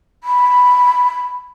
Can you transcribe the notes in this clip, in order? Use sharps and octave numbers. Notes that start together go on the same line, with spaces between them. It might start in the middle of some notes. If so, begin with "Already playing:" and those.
B5